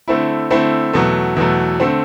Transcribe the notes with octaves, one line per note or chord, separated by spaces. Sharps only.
D3 A3 C4 E4
D3 A3 C4 E4
E2 B2 F#3 A3
E2 B2 F#3 A3
D3 A3 C4